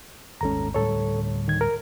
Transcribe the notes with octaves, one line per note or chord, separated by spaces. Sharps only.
D#1 G#1 G#3 C#4 A4 A#5
D2 A2 G3 A4 C#5
D#3 G#6
A#4